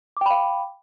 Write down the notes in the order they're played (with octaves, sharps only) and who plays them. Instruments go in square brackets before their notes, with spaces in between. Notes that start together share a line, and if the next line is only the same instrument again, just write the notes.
[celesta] D6
G5
B5
F5